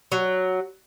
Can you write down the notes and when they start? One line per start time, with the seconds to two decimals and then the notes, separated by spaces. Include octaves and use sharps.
0.12 F#3